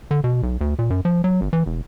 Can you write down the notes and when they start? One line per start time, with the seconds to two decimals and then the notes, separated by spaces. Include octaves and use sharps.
0.11 D3
0.24 B2
0.43 B1
0.61 D2
0.79 A#2
0.90 F#2
1.05 F3
1.24 F#3
1.41 G1
1.53 E3
1.66 E1